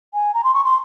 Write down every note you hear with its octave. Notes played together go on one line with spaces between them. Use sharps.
G#5
A#5
C6
C#6
C6